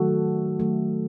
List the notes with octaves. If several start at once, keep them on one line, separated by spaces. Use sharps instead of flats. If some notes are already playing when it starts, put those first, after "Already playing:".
Already playing: D#3 F#3 A3 F#4 A4
D#3 F#3 A3